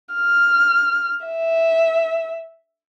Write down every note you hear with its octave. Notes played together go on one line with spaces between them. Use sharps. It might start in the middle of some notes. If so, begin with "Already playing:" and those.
F6
E5